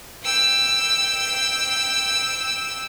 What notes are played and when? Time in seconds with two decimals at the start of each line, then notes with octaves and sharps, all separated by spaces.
0.23 G5 E6